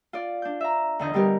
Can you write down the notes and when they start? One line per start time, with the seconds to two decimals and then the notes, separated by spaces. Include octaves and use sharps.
0.13 F4 D5
0.42 D4 G6
0.61 E5 A#5
0.99 E2 D3 D#5 G6
1.14 D3 G3 B3 G4 A#4